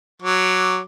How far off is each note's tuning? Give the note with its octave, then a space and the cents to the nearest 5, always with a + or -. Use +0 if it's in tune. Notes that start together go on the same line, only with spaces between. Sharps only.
F#3 +0 D6 +0